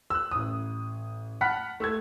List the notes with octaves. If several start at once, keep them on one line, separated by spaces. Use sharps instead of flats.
E6 F#6
A1 D#6
F#5 A5 B5 F6 F#6 B6
A3 E6 G#6